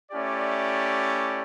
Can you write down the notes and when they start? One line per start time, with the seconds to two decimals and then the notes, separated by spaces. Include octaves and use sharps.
0.11 A3 C#4 E4 G4 D5